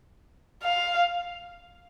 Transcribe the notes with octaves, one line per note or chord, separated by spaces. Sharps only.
F5